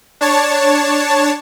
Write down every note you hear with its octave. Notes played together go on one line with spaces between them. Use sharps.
D4 C#5 A5